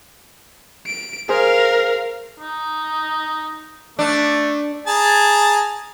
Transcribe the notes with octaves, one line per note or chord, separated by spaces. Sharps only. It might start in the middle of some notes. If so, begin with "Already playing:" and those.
D7
G#4 A#4 C5 F5
D#4
A3 D4
G#4 A5 A#5